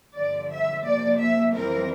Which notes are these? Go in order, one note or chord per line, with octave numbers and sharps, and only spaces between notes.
G2 D3 F3 D5
E5
C3 F3 A#3 D5
E5
F2 E3 G3 C4 A#4